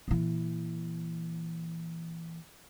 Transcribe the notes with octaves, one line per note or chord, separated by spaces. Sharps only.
A#2 E3